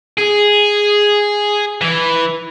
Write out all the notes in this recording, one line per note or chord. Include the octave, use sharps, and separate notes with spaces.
G#4
E3